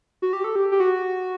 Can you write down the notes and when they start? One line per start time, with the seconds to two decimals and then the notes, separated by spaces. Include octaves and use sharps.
0.22 F#4
0.33 G4
0.44 A4
0.56 G4
0.72 G4
0.80 F#4